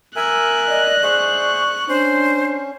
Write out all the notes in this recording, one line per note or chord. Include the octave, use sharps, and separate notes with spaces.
A#4 E5 G#5 E6 F#6
D5 D#5
G#4 C5 E5 C#6
C#4 D4 C5